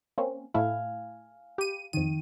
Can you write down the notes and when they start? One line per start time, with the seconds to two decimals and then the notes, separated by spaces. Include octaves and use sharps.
0.18 A#3 C4 C#4
0.54 A2 A3 E4 F5 G#5
1.58 G4 B5 D#7
1.93 F2 D#3 D#7